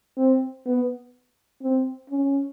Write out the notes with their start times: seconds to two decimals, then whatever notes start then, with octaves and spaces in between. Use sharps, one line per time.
0.18 C4
0.66 B3
1.62 C4
2.10 C#4